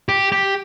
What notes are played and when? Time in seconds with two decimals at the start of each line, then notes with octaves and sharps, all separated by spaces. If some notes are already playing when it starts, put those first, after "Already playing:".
0.09 G4
0.32 G4